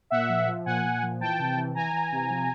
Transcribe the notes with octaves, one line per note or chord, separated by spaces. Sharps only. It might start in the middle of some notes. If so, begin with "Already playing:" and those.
A#2 E5 F#5
F3
F3
A#2 F#5 G#5
A#2
F3
E3 G5 A5
C3
E3
E3 G#5 A#5
E3
C3
F3